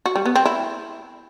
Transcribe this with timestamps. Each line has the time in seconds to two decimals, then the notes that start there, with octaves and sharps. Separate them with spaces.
0.06 F#4
0.16 G3
0.26 B3
0.36 C4
0.45 E4